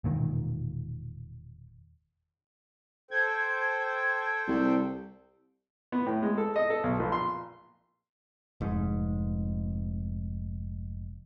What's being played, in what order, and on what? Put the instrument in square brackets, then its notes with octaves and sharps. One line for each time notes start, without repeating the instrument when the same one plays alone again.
[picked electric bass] E1 A#2 D#3
[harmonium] A4 C5 G5 [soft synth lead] G#6
[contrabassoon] C2
[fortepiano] B3
A2
G#3
A4
D#5
A4
B1
A#1
C6
[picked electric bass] F1 G#2